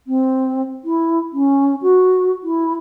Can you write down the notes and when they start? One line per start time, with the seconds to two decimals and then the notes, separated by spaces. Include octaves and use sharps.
0.07 C4
0.84 E4
1.33 C#4
1.82 F#4
2.43 E4